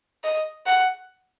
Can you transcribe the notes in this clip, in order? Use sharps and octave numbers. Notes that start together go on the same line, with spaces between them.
D#5
F#5